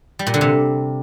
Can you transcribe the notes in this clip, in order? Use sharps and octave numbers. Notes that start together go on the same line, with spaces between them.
G3
A#2
D3
C3